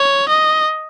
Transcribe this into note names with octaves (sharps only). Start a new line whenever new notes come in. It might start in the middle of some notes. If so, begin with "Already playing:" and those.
Already playing: C#5
D#5